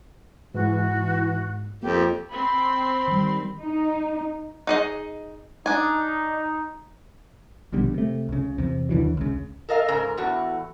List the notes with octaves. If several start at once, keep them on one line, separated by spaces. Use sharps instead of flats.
G#2 E3 F#4
F2 A#3 G4
C4 B5 C6
D#3 G3
D#4
D#4 G#4 D#5
D4 D#4 G#5
A#1 B2 D3 G3
C3 A3
C#2 C#3
E2 C3
D#2 D3 E3 F#3
C#2 C#3
A4 A#4 D#5 F5
G#2 C#3 A#4
E2 A2 F#4